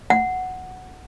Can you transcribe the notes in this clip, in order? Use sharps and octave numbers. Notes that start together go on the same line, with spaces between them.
F#5